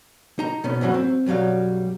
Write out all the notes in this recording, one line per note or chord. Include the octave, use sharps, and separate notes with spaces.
D#4 A#5
B2 B3 C#4
G#2 E3 F#3 C#4
C4
B1 F#2 F#3 G3 F5